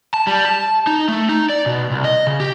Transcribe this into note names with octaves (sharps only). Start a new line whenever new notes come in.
A5
G3
A5
D#4
A3
D#4
D5
B2
C2
D#5
C#3
G4